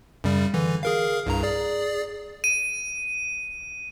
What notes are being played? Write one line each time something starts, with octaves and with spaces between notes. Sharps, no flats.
F#2 C#3 G3
D3 E3
G#4 A#4 F5
C2 G2 A#5
G#4 D5
D#7